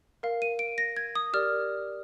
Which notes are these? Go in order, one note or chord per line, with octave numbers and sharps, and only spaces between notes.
A#4 F5
D#7
D7
A#6
G#6
D#6
G4 A#4 D5 F6